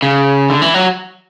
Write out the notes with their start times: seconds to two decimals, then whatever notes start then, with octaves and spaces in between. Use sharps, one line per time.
0.02 C#3
0.50 D3
0.62 E3
0.74 F#3